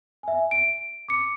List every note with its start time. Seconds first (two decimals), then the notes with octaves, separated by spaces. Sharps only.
0.23 E5 G#5
0.51 D7
1.09 D6 C#7